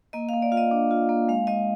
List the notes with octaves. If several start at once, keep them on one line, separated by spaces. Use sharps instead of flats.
A#3 D#5
A#3 F5
D5
F4 F5
D#5
D4
F4
A#3
G#3 F5
G#3 D#5